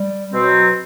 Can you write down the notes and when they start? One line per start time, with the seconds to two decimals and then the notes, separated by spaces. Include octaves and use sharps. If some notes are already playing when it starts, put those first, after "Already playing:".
Already playing: G3
0.34 B2 F#3 C4